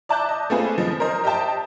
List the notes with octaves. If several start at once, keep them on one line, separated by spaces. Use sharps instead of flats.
D5 E5 A5 D6 F#6 G6
D#5
A3 B3 C4 F4 G#4 B4
F3 D#5
A#4 C5 D#5
G4 D#5 E5 G5 A5